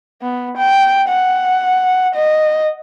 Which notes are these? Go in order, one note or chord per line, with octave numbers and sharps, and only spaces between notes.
B3
G5
F#5
D#5